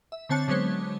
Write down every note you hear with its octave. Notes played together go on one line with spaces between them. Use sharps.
E5
D3 C4 C#5 A5 F#6 C#7
D3 F#3 G#3 B3 C5 C#5